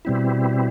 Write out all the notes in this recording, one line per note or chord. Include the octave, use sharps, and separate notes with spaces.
B2 G3 C4 E4